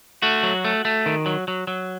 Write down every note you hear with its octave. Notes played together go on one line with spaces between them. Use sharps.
A3 F#4
F#3
A3
A3
D#3
F#3
F#3
F#3